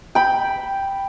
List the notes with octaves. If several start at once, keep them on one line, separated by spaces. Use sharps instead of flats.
G5 B5